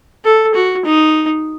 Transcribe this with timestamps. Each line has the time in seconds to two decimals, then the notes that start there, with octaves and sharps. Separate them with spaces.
0.24 A4
0.54 F#4
0.85 D#4